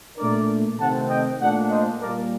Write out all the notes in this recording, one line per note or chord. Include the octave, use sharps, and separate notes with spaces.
A#2 A3 D4 A#4 D5
C3 D#3 A3 C4 F#5 A5
D#5 G5
A#2 A3 D4 D5 F#5
C5 D#5
A#2 G3 A#3 A#4 D5